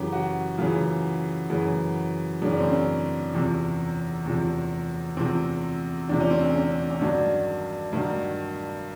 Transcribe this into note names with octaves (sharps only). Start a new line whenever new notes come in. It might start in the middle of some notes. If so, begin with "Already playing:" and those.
Already playing: F#2 C#3 E3 G4
F#4
F#2 C#3 E3 F4
F#2 C#3 E3
F#2 C#3 E3 D4
C#4
C4
C#4
E2 C3 F3
E2 C3 F3
E2 C3 F3 C4
E2 C3 F3 D4
C#4
C4
C#4
C#4
C#4
G2 D#3 F#3 D4
G2 D#3 F#3